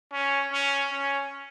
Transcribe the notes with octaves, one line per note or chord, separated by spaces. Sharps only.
C#4
C#4
C#4